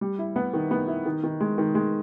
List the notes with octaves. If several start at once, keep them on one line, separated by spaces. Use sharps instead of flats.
G3
E4
B3
D#3
B3
E4
D#3
D#3
G#3
D#3
G#3